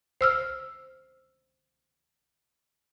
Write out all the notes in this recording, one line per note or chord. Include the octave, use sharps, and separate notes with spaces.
C5 E6 F6